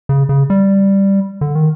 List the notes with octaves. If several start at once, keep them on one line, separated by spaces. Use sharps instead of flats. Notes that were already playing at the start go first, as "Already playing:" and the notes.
C#3
C#3
G3
D3
D#3